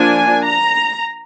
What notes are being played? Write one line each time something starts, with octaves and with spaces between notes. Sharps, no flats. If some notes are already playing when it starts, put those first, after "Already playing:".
Already playing: F3 A#3 D4 G#5
A#5